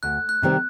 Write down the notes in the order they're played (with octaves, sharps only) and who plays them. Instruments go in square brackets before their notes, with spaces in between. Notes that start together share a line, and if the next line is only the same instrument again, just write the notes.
[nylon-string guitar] D2 [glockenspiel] F#6
[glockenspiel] F#6
[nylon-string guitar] C3 D#3 G3 C4